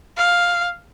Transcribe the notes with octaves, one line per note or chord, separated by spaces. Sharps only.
F5